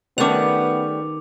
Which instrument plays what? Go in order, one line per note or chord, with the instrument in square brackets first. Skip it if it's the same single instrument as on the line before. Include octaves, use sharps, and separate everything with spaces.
[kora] D#3 F#5 [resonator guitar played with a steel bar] G3 A3 C#4 [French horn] B3 [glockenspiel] D6 F7